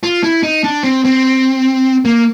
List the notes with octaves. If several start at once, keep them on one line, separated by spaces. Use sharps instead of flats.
F4
E4
D#4
D4
C4
C4
A#3